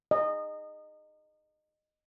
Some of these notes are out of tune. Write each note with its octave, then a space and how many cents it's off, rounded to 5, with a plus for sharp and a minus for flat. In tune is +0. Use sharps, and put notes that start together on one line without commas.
D#5 -20